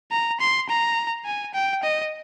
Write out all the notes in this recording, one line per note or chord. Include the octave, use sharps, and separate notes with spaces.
A#5
C6
A#5
G#5
G5
D#5